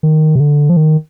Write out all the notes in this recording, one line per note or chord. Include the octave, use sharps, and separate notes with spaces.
D#3
C3
D3
F3
D#3